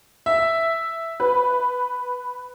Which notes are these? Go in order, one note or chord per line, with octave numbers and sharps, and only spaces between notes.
E5
B4